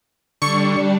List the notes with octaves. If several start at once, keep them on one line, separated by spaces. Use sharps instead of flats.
D3 G3 D4 C#6 C#7